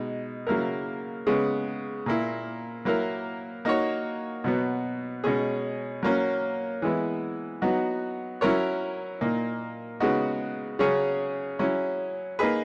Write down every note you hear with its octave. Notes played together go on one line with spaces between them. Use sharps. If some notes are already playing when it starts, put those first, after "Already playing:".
Already playing: B2 G#3 D#4
C#3 F#3 A#3 E4 A#4
C#3 G#3 B3
A#2 A#3 E4
F#3 A#3 E4 A#4
A#3 D#4 F#4 C#5
B2 F#3 B3
B2 G#3 C#4 G#4
F#3 A#3 C#4
E3 G#3 B3 E4
F#3 B3 D#4 F#4
F#3 C#4 E4 A#4 C#5
A#2 A#3 D#4
C#3 G#3 B3 D#4 F#4
C#3 F#3 C#4 G#4 C#5
F#3 C#4 E4 G#4
A#3 D#4 G#4 B4